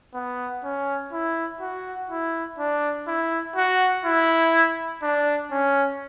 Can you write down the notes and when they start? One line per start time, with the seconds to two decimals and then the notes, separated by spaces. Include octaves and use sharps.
0.14 B3
0.64 C#4
1.12 E4
1.61 F#4
2.10 E4
2.59 D4
3.08 E4
3.56 F#4
4.05 E4
5.02 D4
5.51 C#4